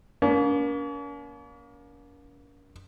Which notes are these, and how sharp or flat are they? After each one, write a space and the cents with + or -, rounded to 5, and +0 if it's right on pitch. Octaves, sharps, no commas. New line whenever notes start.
A#3 +30 C#4 +45